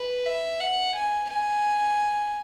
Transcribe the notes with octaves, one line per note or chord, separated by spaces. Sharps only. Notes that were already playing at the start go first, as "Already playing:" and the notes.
Already playing: B4
E5
F#5
G#5
G#5